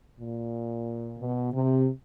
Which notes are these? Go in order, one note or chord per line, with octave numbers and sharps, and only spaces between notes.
A#2
B2
C3